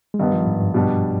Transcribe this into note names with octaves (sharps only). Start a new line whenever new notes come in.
G#3
G2 D#3 G3 B3
F3
G#2
G2
B2 G3 D4